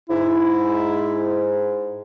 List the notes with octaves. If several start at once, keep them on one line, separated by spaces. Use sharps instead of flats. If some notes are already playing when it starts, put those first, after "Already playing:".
G#2 E4